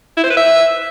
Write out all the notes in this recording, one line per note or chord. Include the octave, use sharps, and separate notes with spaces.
E4
C5
B4
E5